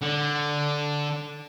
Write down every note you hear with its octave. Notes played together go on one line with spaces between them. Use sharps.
D3